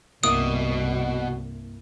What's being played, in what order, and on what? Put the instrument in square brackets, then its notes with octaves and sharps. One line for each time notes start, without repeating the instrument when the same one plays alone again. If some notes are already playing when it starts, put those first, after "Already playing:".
[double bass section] C2 [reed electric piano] G2 A#3 E4 [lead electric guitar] B2 [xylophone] D#6